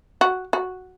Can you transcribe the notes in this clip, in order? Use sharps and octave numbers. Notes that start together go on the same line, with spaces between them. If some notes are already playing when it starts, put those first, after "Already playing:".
F#4
F#4